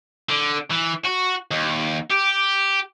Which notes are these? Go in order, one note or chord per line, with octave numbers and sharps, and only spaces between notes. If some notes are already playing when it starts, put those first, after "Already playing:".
D3
E3
F#4
D#2
G4